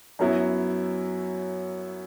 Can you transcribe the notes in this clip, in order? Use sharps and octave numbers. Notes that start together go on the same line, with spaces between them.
F#2 F#3 B3 E4